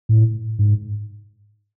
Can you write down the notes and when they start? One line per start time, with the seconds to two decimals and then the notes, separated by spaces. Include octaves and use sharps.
0.09 A2
0.59 G#2